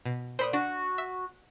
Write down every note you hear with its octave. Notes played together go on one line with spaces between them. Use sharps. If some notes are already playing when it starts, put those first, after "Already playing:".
B2
A#2 C5 B5 D#6
D4 F#4
E5